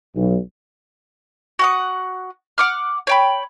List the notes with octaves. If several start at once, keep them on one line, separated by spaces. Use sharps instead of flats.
B1
F#4 F#5 D#6
F#5 D6 F6
C#5 G5 B5